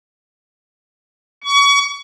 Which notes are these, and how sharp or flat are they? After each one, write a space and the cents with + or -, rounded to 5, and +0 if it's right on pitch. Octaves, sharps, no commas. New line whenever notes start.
C#6 +30